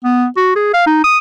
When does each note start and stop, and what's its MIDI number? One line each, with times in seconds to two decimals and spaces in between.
0.04 0.26 59
0.37 0.52 66
0.56 0.71 68
0.74 0.85 77
0.87 1.01 63
1.04 1.18 87